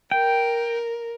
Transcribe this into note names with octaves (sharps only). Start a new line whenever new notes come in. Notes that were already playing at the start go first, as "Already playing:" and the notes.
A#4 G5